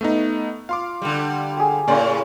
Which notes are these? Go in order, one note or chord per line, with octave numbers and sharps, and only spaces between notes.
A3 B3 D#4
F4 F5 C6 D6
D3 G3
G4 G#4
A2 C#3 A#3 C#4 D5 A#5 C6